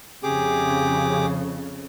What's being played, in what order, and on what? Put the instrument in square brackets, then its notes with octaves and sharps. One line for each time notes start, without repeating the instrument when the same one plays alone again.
[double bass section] F2 C#3 [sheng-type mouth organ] G4 G#4 D6